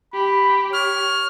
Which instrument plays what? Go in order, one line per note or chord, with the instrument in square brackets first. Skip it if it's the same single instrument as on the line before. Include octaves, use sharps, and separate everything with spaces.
[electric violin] G4 [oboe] B5
[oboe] C#5 [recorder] F6